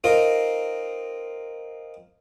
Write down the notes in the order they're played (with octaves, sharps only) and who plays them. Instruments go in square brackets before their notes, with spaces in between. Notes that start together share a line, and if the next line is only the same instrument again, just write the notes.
[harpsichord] C4 D#4 F4 A#4